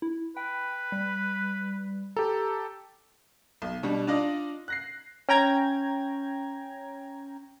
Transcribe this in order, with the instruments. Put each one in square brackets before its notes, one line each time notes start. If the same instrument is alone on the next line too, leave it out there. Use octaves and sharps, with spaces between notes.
[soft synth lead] E4
[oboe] B4 [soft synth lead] G5
[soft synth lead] G3
[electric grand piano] G4 A4 [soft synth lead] A#5
[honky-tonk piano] B1
B2 G3 D4
D4 D#4 F4 D5 D#5
F#6 A#6 C7
[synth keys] C#4 G5 A#5 G#6